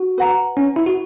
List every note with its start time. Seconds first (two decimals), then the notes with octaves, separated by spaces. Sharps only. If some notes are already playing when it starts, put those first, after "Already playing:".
Already playing: F#4
0.18 B4 F#5 A#5
0.57 C#4
0.76 E4
0.86 F#4